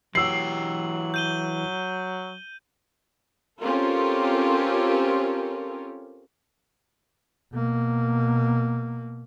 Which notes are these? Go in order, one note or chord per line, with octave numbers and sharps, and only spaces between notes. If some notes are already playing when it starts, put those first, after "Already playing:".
E3 F#3 G4 E6 C7 F#7
G6 D#7 G7
C4 C#4 F4 G4 A4 A#4
B2 A#3